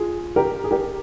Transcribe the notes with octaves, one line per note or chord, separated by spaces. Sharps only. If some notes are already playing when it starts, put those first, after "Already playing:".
Already playing: F4 G#4
G4 A#4
G#4
G4 A#4